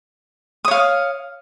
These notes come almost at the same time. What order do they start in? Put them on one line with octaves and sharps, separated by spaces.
D#6 C#5 F5